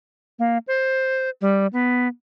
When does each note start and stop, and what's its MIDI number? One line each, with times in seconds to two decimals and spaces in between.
0.39 0.58 58
0.68 1.30 72
1.41 1.67 55
1.73 2.08 59